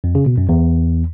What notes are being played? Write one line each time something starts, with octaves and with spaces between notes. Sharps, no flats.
F2
C#3
B2
F#2
E2